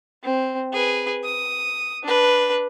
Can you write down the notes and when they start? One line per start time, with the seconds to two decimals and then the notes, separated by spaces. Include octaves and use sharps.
0.24 C4
0.73 G#4 B4
1.23 D#6
2.03 D4 B4